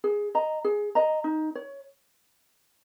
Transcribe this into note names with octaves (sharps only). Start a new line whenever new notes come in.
G#4
D#5 A#5
G#4
D#5 A#5
D#4
C#5